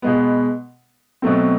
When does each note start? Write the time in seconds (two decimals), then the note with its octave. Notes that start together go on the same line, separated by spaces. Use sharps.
0.02 B2 G#3 B3
1.22 B2 F#3 A3 C4